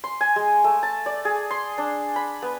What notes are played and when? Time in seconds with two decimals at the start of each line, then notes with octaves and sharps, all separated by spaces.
0.04 C6
0.21 G#5
0.36 G#3
0.64 A3
0.83 A5
1.06 D5
1.25 G#4
1.51 C6
1.78 D4
2.16 B5
2.42 B3